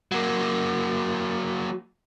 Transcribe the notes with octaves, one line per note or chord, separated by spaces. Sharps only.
F#3 A#3